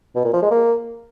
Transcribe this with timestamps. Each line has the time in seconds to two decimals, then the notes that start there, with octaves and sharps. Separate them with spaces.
0.16 B2
0.25 A#2
0.33 F3
0.42 G#3
0.51 A#3